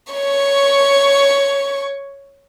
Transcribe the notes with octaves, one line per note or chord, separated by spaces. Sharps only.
C#5 C#6